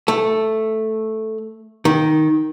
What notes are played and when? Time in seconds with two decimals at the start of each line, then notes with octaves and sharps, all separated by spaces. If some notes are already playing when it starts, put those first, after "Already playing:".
0.08 A3
1.85 D#3